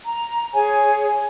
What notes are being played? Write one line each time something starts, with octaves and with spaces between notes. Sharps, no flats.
A#5
G#4 C#5 G#5